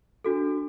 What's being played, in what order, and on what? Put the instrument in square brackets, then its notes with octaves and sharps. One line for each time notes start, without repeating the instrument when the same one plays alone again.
[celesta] D4 F#4 A4